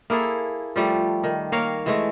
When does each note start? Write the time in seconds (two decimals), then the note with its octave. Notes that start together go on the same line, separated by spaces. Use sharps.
0.10 A#3 E4 G#4 A4
0.76 F3 G3 A3
1.24 D#3
1.52 A#3 A#4 C#5 F5
1.86 E3 G#3 A3